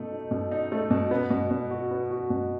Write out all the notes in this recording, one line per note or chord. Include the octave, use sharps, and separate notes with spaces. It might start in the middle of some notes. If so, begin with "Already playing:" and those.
Already playing: B2 A3 D#4
D#4
B2
D#4
A3
B2
B3
B2
B2
F#4
B3
F#4
B2